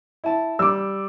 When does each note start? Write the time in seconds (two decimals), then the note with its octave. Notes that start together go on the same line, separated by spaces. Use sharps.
0.24 E4 A5
0.59 G3 D6 E6